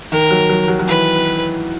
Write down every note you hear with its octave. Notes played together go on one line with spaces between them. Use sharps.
D#3 A#4
F#3
F#3
F#3
F#3
E3 B4